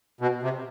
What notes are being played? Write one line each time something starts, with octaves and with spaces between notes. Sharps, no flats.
B2
C3